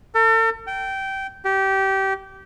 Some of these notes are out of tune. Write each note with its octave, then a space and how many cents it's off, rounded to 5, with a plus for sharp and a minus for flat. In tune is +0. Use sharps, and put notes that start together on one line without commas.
A4 +40
G5 -20
G4 -20